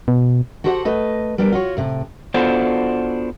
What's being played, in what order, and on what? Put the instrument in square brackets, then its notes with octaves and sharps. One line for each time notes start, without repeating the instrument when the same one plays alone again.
[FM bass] B2
[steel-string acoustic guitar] F#4 G4 A4 C5 D#5 F#5
A3 B4 D#5
G3 B3 D4 G4 A#4
F4 F#4 C#5
A2 C3
[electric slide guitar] B3 D4 F4 F#4 A4 C5